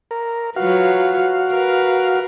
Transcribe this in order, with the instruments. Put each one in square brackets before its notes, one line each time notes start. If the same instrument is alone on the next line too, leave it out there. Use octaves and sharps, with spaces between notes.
[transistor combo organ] A#4
[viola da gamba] F#3 F4 B4 [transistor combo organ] F#4 F5
[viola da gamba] A#4 B4